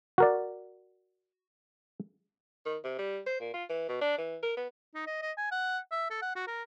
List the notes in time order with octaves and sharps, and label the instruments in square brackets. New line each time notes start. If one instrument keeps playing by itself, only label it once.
[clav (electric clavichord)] F#4 A#4 D5
[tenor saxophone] D#3
C3
G3
C5
A#2
F4
E3
B2
D4
E3
A#4
B3
[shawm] D#4
D#5
D#5
G#5
F#5
E5
A4
F#5
F#4
A#4